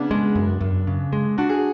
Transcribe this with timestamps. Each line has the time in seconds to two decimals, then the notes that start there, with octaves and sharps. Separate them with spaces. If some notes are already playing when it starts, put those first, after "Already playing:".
Already playing: C#3 B3 D4
0.10 G#3 D4
0.35 F#2
0.61 F#2
0.87 C#3
1.13 G#3
1.38 D4 F#4
1.49 G#4